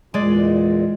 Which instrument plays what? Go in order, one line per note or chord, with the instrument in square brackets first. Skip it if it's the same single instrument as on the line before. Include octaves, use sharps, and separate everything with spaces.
[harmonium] E2 A#2 [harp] G#3 D5